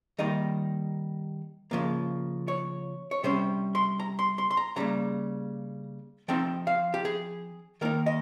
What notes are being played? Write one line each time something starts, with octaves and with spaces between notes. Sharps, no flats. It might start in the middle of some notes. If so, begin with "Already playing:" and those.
D#3 G3 A#3 D#4 D#5
C#3 F3 A#3
C#5
C#5
C3 G3 C#4 C5
C6
A#5
C6
C6
C6
A#5
C#3 G3 A#3 A#5
F3 C4 D#4 G5
F5
G4
G#4
D#3 A#3 D#4 A#4
D#5